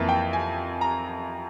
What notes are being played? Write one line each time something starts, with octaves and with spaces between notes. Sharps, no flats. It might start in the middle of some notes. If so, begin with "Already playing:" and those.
Already playing: F2 E3 A#3 E5
G5
G#5
A#5